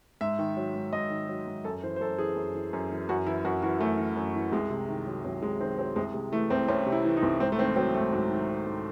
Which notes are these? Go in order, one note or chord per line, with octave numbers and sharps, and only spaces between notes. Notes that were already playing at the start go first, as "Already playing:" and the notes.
G#2 E5
D#3
F#3
G#2
G#2 D#5
D#3
F#3
G#2
F#2 A4
E3 C5
C5
F#2 A4
E3 G#4
F#2
E3
F#2
E3
F#2 F#4
E3 E4
F#2 F#4
E3 F#4
F#2 A3
E3
F#2
E3
C2 G#3
C3
D#3
F#3
C2 F#3
C3 G#3
D#3 C4
F#3 C4
C2 G#3
C3 G#3
E3 A3
C2 C4
C2 C#4
C3
E4
E3
D#4
C2
G#2 C4
A3
D#3 C4
F#3 C4
G#2 A3
G#2 F#3
D#3
F#3
G#2